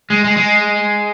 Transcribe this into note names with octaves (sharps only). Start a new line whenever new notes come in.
G#3
G#3
G#3